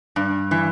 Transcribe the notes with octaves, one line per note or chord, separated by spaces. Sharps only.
G2
E3